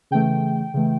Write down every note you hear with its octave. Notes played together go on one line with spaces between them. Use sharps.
C#3 E3 A3 G5
C#3 E3 A3